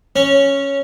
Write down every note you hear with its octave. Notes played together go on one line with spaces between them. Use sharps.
C#4